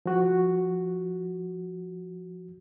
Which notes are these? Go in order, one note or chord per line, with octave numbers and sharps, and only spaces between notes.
F3 F#4